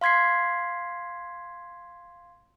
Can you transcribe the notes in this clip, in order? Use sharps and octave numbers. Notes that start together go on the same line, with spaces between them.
F5 C6 G#6 B6 C7